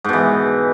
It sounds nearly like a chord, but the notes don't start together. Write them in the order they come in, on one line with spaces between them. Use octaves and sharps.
G#2 B2 E3